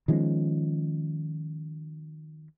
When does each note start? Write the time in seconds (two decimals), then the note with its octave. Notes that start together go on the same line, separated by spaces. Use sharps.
0.08 D#3 F3 G#3 C#4